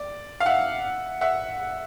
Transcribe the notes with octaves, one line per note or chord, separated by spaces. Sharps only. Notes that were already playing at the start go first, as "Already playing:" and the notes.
Already playing: D5
F5
E5 F#5
E5 F#5